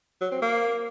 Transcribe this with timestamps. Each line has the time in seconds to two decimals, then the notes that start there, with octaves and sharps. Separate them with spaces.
0.21 F#3
0.31 C4
0.42 A#3